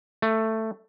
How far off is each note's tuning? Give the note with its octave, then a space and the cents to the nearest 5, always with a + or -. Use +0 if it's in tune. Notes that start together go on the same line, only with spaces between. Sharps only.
A3 +10